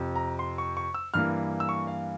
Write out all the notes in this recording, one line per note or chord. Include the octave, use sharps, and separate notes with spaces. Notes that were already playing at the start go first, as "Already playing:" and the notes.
Already playing: F2 C3 F3
A#5
C6
C#6
C#6
E6
G2 E3 A#3 F6
E6
C#6
F5